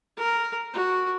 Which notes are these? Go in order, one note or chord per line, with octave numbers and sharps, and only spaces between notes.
A#4
F#4